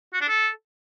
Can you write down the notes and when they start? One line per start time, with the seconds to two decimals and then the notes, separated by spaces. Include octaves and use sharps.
0.14 F#4
0.21 D4
0.28 A4